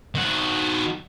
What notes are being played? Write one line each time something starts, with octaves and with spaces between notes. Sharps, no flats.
D#3 F#4